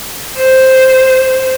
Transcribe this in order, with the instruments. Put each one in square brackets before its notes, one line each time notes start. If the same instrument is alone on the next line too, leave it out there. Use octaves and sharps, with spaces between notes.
[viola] C5